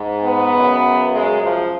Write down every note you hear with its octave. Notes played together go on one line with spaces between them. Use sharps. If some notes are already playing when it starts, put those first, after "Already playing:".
Already playing: G#2
B3
F#2 C#3
G#3
F3